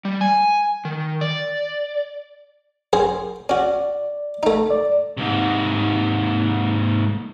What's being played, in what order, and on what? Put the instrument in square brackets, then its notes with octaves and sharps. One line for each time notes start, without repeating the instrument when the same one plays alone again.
[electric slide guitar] G3
G#5
D#3
D5
[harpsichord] F#2 G#4 C5
[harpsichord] C#4 F#4 [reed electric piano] D5
[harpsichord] A3 D#4
[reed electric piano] D5
[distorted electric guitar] G#2 C3